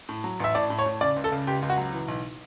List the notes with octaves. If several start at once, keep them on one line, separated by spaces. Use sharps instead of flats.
A2
F#3
A1 E5
A2 D5
A2
C#5
A2
C#3 D5
C#2
A4
C#3
C#2 G4
C#2
F#4
F#3
E3
B1